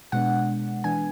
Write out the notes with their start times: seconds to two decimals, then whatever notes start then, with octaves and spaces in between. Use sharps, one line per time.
0.12 B2 G#3 B3 D4 F#5
0.84 E3 B3 D4 G#5